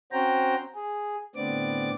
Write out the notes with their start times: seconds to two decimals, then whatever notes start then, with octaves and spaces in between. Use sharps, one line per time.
0.12 C4 C#4 F#4 C5 G5 A#5
0.75 G#4
1.36 A2 D3 B3 C4 D5 D6